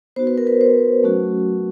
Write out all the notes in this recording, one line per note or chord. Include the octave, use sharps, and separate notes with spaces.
B3 D#4 F#4 C5
B4
A#4
B4
C5
F#3 A3 C#4 F#4